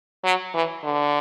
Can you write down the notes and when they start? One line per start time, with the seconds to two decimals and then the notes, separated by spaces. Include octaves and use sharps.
0.24 F#3
0.54 E3
0.84 D3